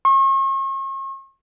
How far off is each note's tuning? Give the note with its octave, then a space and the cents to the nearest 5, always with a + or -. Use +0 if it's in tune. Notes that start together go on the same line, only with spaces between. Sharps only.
C#6 -40